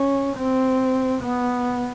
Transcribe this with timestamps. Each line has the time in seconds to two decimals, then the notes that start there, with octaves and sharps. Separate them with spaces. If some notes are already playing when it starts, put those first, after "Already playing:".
Already playing: C#4
0.38 C4
1.23 B3